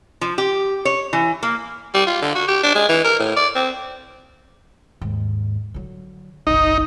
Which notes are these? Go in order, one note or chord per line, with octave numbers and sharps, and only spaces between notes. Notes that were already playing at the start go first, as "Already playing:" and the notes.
F3
G4
C#5
E3
A#3
G3
F4
D3
F#4
G4
D4
G#3
E3
A#4
A2
D5
C4
D#2 G#2
D3 F#3
F#1 B1 D#4